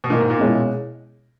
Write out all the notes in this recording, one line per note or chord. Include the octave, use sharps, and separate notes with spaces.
B2
A#2 D#3 A#3 D#4
G#2
A#2
B2 G#3 C#4 E4